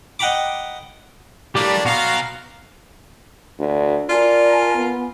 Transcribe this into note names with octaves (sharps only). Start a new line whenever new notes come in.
D#5 F#5 G5 A#5 B5 D6
A2 G3 A#3 D4 G4 D6
B2 B3 F#4 F5 A#5
D2
F4 A#4 D5 G#5 A5
B3